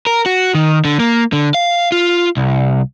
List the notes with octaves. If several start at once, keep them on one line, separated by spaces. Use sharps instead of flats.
A#4
F#4
D#3
D3
A#3
D3
F5
F4
C2